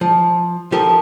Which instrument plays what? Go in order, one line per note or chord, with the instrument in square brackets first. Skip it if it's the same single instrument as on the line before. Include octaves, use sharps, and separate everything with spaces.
[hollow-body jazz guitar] F3
F3 G4 A4 A#4 D#5